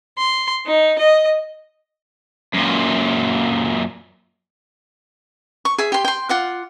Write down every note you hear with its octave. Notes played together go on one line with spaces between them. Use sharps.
C6
D#4
D#5
F#2 A#2
C#6
G#4 E5
G4 C6
G5 C6
F4 F#5 D6